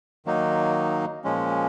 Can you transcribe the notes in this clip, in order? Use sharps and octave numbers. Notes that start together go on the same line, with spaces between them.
D#3 F#3 A#3 D#4
A#2 F3 G#3 C#4